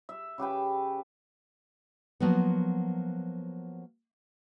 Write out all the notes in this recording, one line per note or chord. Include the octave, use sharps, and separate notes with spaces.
E5
C#3 G4 B4 G5
F3 F#3 A#3 B3